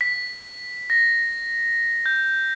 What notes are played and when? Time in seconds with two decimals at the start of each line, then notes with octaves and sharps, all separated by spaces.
0.01 B6
0.90 A#6
2.06 G6